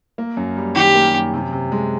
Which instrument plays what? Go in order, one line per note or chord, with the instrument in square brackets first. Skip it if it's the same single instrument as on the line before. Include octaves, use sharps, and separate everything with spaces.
[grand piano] A#3
F#2
G3
[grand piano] D#3 [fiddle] G4
[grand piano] A#3
F#2
C3
C3
G#3